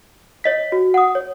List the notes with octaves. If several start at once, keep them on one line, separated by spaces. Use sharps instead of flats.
C#5 D#5 B6
F#4
F#5 D#6
C#5